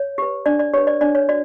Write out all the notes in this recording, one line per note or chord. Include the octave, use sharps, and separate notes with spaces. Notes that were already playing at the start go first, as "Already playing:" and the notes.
Already playing: C#5
G4 B4
D4 D5
D5
G4 B4 C#5
D5
D4 D5
C#5
F#4 D5